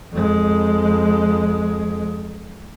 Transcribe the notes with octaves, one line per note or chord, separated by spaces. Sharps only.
F2 G#3